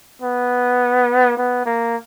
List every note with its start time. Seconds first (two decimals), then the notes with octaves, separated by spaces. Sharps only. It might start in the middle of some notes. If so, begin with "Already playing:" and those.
0.22 B3
1.37 B3
1.66 A#3